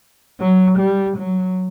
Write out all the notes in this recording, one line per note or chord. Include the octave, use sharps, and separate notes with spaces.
F#3
G3
F#3